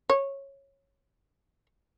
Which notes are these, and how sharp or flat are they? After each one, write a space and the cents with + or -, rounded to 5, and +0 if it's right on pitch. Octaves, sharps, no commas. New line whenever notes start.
C#5 -10